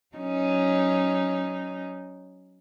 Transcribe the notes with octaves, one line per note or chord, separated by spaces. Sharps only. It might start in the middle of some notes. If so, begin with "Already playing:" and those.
F#3 C#4 D#4